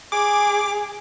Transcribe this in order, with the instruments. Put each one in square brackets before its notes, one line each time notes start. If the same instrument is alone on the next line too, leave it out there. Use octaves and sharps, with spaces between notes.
[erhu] G#4 [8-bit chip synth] D6